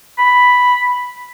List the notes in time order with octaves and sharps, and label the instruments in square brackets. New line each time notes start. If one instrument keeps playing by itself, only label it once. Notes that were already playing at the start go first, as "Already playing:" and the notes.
[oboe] B5